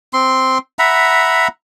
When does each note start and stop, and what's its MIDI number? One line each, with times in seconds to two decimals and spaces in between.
0.13 0.58 60
0.13 0.58 84
0.79 1.48 76
0.79 1.48 78
0.79 1.48 82
0.79 1.48 83